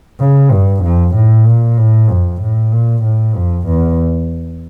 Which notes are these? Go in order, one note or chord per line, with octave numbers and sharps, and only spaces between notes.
C#3
G2
F2
A2
A#2
A2
F2
A2
A#2
A2
F2
E2